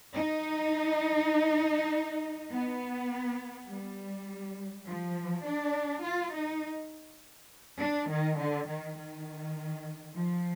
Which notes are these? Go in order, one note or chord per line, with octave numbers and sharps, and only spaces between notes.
D#4
B3
G3
F3
D4
F4
D#4
D4
D#3
D3
D#3
D#3
F3